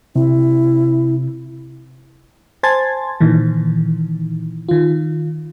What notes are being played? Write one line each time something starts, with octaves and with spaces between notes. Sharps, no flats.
C3 E4
C5 G#5 A5 C6 G#6 A6
A#2 D#3 E3
D#3 F4